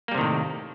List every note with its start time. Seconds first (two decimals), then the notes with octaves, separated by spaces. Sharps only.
0.08 A#3
0.11 G3
0.15 C3
0.18 D#3
0.21 A2